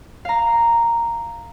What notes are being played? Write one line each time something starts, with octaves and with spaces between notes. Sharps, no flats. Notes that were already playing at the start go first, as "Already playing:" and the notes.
F5 A#5